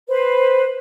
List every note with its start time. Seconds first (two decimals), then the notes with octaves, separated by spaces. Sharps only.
0.08 B4 C5